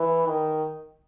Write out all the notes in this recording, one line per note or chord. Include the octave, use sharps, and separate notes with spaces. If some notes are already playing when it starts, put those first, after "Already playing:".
Already playing: E3
D#3